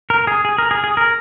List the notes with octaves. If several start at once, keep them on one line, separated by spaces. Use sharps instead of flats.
A#4
G#4
G#4
A#4
G#4
G#4
A#4